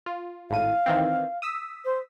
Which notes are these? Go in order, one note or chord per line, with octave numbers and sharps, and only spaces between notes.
F4
G#1 A2 F5 D#7
D#3 E3 C4
D#6 E6 B6
C5